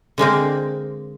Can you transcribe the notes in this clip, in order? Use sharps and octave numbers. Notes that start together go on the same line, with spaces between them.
D3 G#3 A#3 C4